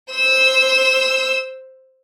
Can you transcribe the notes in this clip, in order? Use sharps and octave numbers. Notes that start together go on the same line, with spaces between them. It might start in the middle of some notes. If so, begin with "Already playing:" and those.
C5 E6